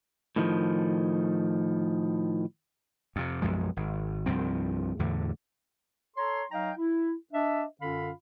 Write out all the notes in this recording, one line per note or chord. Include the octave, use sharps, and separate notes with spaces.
A2 D#3 F3
F2 C3
B1 F#2 F3 G#3
G#1
C2 G2 F3 C4
E2 A2 D3
A4 C#5 A#5 C6
F#3 D#4 D#5 F5 G5 A#5
E4
D4 D#5 E5
F#2 D3 C#4 F4 F5 B5